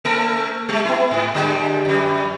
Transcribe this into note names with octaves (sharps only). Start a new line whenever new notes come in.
A3 A4 A#4
G3 G#3
B3 E4
G#2
D3 G3 G#3
F2 G3